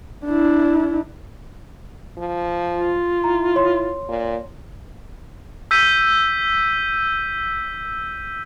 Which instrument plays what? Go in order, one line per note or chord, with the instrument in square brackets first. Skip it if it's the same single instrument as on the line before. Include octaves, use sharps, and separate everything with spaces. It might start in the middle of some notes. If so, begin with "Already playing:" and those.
[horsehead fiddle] D4 E4
[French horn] F3
[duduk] F4
[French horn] E4 [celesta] A#5
[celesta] C#5 C6
[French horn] A#2
[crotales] E6 G6 B6 D#7